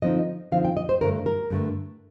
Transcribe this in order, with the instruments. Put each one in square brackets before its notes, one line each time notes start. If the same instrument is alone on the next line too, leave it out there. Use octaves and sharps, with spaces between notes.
[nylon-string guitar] D3 F3 C4 D#4 D#5
D3 F3 C4 D#4 F5
G5
D#5
C5
G2 D3 A3 A#4
A#4
G2 D3 A3